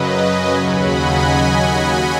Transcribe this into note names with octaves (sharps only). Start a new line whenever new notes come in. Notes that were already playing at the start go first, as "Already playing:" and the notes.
Already playing: F#2 C#3 F#3 B4 D#5
D#5 G#5
D#2 C#3 F#3 F#5 B5
D#5 G#5